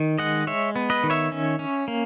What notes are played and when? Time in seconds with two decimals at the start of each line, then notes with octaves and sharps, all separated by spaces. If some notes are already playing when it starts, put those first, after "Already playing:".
Already playing: D#3
0.18 G#3 D#5 F#5
0.47 G#3 C#5 E5
0.76 B3
0.90 B4 D#5
1.04 D#3
1.10 C#5 E5
1.32 C#4
1.59 C#4
1.88 A#3